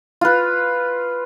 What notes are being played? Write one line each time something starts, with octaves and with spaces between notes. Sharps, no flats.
F4 B4